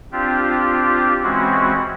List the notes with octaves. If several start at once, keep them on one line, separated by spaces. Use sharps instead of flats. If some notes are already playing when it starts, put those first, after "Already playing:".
C4 D4 F4 G4
E3 G#3 C4 C#4 F#4